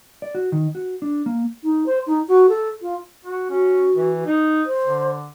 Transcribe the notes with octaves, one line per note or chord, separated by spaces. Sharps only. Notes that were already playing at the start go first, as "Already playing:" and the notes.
D5
F#4
D#3
F#4
D4
A#3
D#4
C5
D#4
F#4
A4
F4
F#4
C#4 F#4
E3
D#4
C5
D3